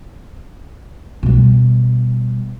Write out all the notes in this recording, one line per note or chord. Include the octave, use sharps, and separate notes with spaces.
B2 G3